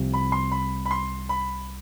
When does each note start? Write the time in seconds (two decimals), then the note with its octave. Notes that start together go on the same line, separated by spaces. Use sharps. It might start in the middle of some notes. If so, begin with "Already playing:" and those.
Already playing: C2 C3 F3
0.14 B5
0.32 C6
0.52 B5
0.86 B5
0.91 C6
1.29 B5